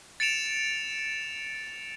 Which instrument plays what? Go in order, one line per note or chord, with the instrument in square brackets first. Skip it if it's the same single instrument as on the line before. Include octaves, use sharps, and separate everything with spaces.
[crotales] A6 C#7 D7 E7 F7